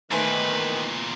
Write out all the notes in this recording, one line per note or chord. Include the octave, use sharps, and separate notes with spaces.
E2 A#2 D#3 A3 B4 C5 G#5